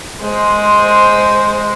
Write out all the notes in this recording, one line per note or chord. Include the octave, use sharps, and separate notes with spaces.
G#3 C5